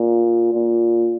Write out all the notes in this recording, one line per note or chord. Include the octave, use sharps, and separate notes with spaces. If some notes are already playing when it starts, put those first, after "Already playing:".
Already playing: A#2
A#2